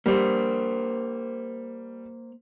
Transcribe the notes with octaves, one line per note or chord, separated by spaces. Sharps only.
G3 A#3 C5